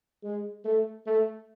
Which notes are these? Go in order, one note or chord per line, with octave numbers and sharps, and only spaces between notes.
G#3
A3
A3